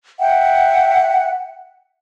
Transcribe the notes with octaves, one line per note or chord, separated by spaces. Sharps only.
E5 F#5 G5